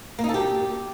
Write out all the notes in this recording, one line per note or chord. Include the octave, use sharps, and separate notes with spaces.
A#3
D#4
A4
G4